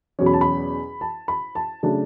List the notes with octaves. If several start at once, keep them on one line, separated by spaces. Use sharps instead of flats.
E2 B2 F#3 C#4
B5
A5
B5
A5
B5
A5
C#3 F#3 A3 D4 A5